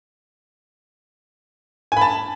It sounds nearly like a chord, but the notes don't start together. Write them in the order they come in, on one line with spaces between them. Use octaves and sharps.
G#5 B5 A5